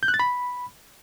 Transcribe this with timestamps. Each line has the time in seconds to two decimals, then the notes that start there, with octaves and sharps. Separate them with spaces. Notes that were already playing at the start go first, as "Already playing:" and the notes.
0.03 G6
0.08 F#6
0.14 A6
0.20 B5